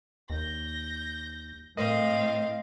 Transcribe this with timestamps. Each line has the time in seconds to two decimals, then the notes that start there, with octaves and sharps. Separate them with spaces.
0.30 D#2 G6 A#6
1.77 A2 C4 A#4 D#5 F5